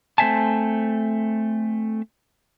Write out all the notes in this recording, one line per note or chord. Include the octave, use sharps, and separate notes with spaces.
A3 C4 C5 E5 G#5 A5